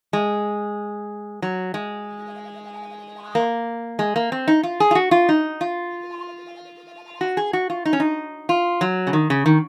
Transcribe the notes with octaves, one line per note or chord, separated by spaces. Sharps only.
G#3
F#3
G#3
A#3
G#3
A#3
C4
D#4
F4
G#4
F4
F#4
F4
D#4
F4
F#4
G#4
F#4
F4
D#4
C#4
D#4
F4
F#3
C#3
D#3
C#3
D#3